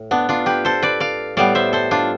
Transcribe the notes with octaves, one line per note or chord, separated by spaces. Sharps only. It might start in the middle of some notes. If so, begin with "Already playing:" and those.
Already playing: A2
B3 D4
D4 F4
G4 B4
A4 C5
B4 D5
D5 F5
A2 G3 B3 D5 F5
C5 E5
A4 C5
D4 F4